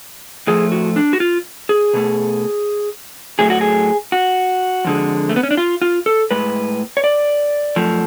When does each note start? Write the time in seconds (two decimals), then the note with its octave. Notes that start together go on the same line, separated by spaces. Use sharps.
0.47 A2 F3 A3 G#4
0.72 F#4
0.96 D4
1.13 F#4
1.20 F4
1.69 G#4
1.93 B2 A3
3.39 A2 F#3 A3 G#4
3.50 F#4
3.61 G#4
4.12 F#4
4.85 F2 D3 G#3
5.29 A3
5.36 B3
5.43 C#4
5.51 D4
5.57 F4
5.82 F4
6.06 A4
6.31 A2 G#3 B4
6.97 C#5
7.04 D5
7.76 F#2 F3 A3